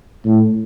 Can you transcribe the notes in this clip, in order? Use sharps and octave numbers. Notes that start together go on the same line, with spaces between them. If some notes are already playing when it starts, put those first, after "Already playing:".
A2